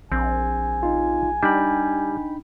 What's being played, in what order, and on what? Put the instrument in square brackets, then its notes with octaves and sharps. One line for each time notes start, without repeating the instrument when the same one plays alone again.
[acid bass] A#1 [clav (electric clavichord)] C4 [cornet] G#5
[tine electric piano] D#4 F4
[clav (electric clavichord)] G3 [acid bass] D4 [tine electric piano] D#4 G5 B5